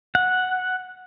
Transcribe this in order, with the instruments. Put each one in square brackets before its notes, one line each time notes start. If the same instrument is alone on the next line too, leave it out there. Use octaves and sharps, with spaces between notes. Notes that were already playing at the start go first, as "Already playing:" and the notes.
[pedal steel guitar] F#5